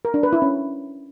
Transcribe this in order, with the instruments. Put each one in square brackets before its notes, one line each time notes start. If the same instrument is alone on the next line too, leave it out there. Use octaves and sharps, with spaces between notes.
[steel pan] A#4
D4
B4
E4
C#4